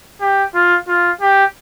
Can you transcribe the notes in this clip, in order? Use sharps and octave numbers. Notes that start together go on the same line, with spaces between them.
G4
F4
F4
G4